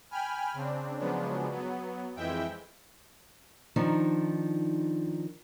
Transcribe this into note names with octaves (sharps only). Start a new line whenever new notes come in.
G5 G#5 B5 F6
C#3 C4 D4
C#3 F3 F#3 G#3 B3 D4
F#3 B3
F2 E3 G#3 E4 E5 G5
D#3 F3 D4 D#4